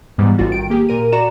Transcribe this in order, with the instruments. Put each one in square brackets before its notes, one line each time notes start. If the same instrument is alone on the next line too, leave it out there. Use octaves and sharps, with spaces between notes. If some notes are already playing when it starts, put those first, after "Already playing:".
[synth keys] G#2 E3 G3 B3
A1 G3 F4 F#4 A6
D#3 G5 D7
A#3 G4 G#4
A#2 A#4 D#7
F#4 D5 A#5 E7